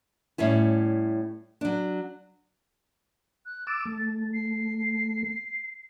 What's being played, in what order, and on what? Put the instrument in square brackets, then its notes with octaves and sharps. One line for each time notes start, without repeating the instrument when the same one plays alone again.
[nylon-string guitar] A2 G3 C#4 E4
F#3 D4
[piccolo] F#6
[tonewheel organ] D6 E6 [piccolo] A6
[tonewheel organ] A3
[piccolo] C7